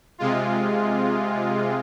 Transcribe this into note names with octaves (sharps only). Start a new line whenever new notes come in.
C3 G#3 F4